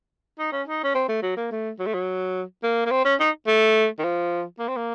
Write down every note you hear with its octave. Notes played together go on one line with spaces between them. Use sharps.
D#4
C#4
D#4
C#4
C4
A3
F#3
A#3
A3
F#3
A3
F#3
A#3
A#3
C4
C#4
D#4
A3
D#3
F3
A#3
C4
A#3